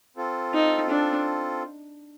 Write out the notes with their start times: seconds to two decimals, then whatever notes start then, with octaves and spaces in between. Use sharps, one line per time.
0.17 C4 F4 A4
0.53 D#4
0.90 D4